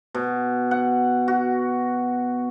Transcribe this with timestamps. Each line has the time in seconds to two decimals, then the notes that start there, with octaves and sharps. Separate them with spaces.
0.14 B2
0.71 F#5
1.28 F#4